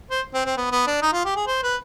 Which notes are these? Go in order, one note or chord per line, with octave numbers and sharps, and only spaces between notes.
C5
C4
C4
B3
B3
D4
D#4
F4
G4
G#4
C5
B4